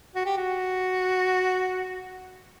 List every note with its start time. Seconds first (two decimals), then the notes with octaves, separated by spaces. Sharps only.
0.15 F#4
0.26 G4
0.37 F#4